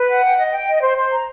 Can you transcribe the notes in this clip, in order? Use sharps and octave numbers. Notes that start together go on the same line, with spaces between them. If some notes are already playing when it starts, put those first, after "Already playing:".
Already playing: B4
F#5
G5
D#5
G5
D#5
C5
C5
A#5